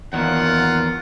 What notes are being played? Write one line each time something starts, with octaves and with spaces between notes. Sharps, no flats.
E2 D#3 A#3 F4 F#5